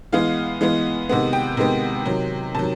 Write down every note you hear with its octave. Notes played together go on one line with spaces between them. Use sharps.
E3 G#3 B3 F5
E3 G#3 B3
C3 D#3 G#3 B3 F#5
G5
C3 D#3 G#3 B3
C3 D#3 F#3
C3 D#3 F#3 A5